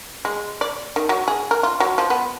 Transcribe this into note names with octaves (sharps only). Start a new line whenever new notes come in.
G#3
D5
D#3
F#3
G#4
A#4
F4
F#3
F3
B3